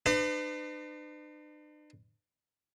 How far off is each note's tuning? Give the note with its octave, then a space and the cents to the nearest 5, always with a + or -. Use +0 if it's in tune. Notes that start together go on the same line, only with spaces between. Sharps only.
D4 +45 B4 +40 D#5 -45